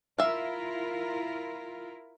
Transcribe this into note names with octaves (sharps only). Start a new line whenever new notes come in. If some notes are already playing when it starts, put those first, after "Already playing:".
E4 F4 A#4 E5 F5